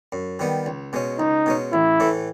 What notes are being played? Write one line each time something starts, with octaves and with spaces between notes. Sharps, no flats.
F#2
D#3 G3 B3
C#2
B2 G#3 C#4
C#2 D#4
B2 G#3 C#4
A1 E4
A2 E3 A3